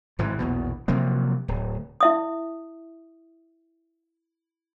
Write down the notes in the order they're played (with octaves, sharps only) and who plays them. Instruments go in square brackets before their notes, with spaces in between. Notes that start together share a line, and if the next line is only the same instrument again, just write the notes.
[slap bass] G#1 G#2 E3
A#1 E2 B2
C3 F3 F#3 A#3
D1
[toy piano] E4 E5 D#6